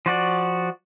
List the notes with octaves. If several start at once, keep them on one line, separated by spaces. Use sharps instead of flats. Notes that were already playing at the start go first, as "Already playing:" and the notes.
F3 F#4 D5